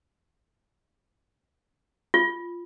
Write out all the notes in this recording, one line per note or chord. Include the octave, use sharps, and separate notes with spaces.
F4